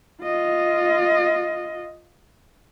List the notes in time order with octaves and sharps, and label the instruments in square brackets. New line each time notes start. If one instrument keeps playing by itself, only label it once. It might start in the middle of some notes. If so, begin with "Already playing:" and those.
[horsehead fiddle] F4 D#5